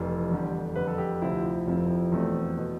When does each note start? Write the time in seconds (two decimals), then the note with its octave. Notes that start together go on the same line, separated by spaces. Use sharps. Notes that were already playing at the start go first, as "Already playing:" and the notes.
Already playing: F1 F2 E3
0.31 E2 D3 G3
0.76 F2 D3 G3 B4
0.87 A4
0.98 G4
1.22 D2 C3 F3 C4 E4
1.67 F1 F2 C3 F3 C4
2.12 E2 B2 A3 C4
2.58 B2